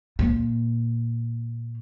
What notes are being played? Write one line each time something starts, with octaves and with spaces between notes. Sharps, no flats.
A#2